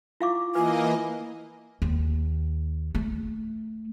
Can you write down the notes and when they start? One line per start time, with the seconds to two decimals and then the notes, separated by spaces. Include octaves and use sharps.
0.21 E4 F4 F5 C#6 D6
0.55 E3 A#3 F4 B4 D#5 G#5
1.82 D#2
2.95 A3